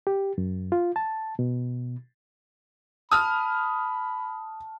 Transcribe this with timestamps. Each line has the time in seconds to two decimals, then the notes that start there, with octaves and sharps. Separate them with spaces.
0.07 G4
0.38 F#2
0.72 F4
0.96 A5
1.39 B2
3.11 A5 B5 D#6 F6